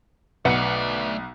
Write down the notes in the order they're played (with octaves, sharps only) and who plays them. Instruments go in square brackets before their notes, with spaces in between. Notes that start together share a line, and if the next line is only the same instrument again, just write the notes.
[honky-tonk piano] B1 C#7 [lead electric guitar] A3 D5 [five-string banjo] B4 F#5